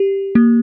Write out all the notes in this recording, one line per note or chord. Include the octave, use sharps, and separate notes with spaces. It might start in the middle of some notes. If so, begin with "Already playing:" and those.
Already playing: G4
A#3